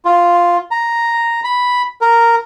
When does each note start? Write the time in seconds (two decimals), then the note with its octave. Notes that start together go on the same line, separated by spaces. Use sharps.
0.05 F4
0.71 A#5
1.44 B5
2.01 A#4